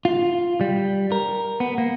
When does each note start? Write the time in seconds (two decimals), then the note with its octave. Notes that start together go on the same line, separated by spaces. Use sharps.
0.05 F4
0.61 G3
1.12 A#4
1.60 B3
1.78 A#3